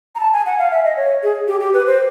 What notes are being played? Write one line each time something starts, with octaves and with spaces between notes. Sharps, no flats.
A#5
A5
G#5
F#5
F5
E5
D#5
C#5
G#4
G4
G4
B4
C5